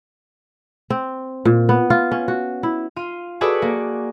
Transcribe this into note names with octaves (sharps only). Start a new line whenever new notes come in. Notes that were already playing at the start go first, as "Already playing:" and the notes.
C4
A#2
B3
F4
C#4
F#4
E4
F4 D#7
F#4 G#4 A4 B4 D5 F#5
A#3